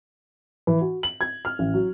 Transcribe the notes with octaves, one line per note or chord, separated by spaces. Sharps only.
E3
F#4
F#7
G#6
F6
A1
F#3